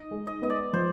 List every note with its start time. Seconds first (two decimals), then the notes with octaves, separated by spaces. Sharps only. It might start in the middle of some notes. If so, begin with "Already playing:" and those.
Already playing: D#4 D#5
0.11 G#3
0.27 D#5
0.42 B3 D#5
0.50 D5
0.73 F3 C5